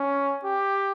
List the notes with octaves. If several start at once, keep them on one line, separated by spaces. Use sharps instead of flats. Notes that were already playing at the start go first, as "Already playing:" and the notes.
Already playing: C#4
G4